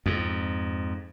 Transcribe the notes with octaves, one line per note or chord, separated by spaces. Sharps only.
F2 G#2